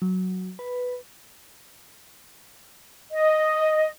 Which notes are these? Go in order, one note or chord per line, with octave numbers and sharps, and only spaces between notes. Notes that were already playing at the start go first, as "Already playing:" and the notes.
F#3
B4
D#5